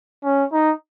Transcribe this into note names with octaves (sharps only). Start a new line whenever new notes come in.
C#4
D#4